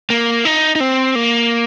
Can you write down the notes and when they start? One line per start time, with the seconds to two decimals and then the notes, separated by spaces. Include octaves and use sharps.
0.10 A#3
0.45 D#4
0.76 D#4
0.80 C4
1.15 A#3